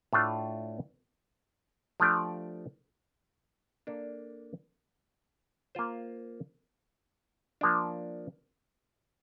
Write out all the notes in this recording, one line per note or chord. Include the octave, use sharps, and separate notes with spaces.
A2 A3 D4 F4
F3 A3 D4 G4 D5
A#3 D4 A4
A#3 F4 C5
F3 A#3 D4